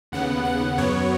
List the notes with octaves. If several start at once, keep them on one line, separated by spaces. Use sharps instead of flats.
D#2 C#3 B3 F#5
F#5
F#2 F#3 B3 C#5